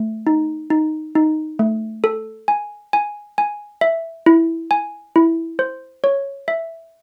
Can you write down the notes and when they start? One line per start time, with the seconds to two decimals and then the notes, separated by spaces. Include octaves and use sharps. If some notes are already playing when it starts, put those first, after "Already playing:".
Already playing: A3
0.27 D#4
0.70 D#4
1.15 D#4
1.59 A3
2.04 A4
2.48 G#5
2.93 G#5
3.38 G#5
3.81 E5
4.26 E4
4.71 G#5
5.16 E4
5.59 C5
6.04 C#5
6.48 E5